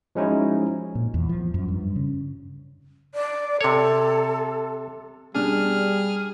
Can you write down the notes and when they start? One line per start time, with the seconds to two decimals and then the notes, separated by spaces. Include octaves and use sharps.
0.15 F3 G#3 C#4 D#4 E4 F#4
0.95 A#2
1.14 E2
1.29 F3
1.54 F#2
1.68 G2
1.96 C#3
3.14 D5
3.61 C3 A4 C#5
5.35 B2 G3 D4 G#4 F6